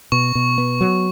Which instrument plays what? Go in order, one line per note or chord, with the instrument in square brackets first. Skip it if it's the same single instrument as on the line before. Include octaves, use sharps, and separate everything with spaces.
[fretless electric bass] B2 [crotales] C#6
[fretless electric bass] B2
B3
F#3